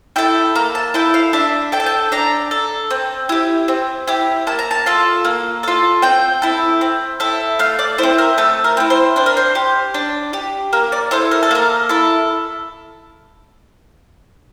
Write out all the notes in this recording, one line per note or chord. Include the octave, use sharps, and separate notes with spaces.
E4 A4 G5
A#3 A#5
A5
E4 A4 G5
F5
D4 E5
A4 G5
A5
G5
D4 A#5
A4
C4
E4 G4
C4
E4 G4
A#3 A5
A#5
A5
F4 A4
A#3
F4 A4
C4 G5
E4 A4
C4
E4 A4
A3 F5
D5
E4 C5
C4
A#4
A3 A4
A#4
C4 E4
C5
D4 C5
A#4
C5
G4
D4
G4
A#3 A#4
D5
E4 A4 C5
A#4
A4
A#3 A#4
E4 A4